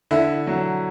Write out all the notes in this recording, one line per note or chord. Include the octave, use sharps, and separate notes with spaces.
D3 E4 E5
F#3